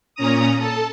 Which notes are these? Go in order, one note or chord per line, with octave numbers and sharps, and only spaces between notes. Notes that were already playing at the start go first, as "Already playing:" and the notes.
A#2 C#4 A#5 D#6
A4 A5